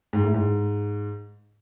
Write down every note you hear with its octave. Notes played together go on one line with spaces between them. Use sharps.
G#2
A2
G#2